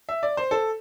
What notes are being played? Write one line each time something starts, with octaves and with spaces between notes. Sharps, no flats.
E5
D5
C5
A4